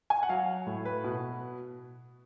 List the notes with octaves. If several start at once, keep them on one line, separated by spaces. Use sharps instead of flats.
G#5
F#5
F#3 F5
A2
B4
B2